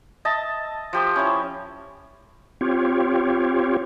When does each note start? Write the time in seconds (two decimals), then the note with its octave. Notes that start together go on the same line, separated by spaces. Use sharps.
0.25 D#5 E5 A5
0.93 F3 G4 C5
1.15 C#4 E4 C#5
2.61 C4 F4 G4 C#5